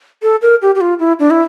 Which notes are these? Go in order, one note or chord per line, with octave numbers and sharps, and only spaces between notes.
A4
A#4
G4
G4
F4
E4
D4
E4